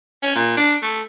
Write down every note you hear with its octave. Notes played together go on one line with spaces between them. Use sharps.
C#4
A#2
D4
A3